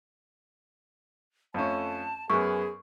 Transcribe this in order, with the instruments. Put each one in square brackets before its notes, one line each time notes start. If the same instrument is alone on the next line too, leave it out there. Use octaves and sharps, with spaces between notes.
[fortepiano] F2 A3 C#4 [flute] A5
[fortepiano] F#2 B3 [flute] G#4 [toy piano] C#6